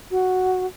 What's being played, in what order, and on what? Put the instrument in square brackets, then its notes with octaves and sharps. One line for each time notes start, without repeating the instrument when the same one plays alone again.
[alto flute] F#4